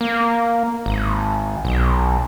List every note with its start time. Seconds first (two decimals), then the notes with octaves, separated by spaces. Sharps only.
0.01 A#3
0.86 G#1
1.65 B1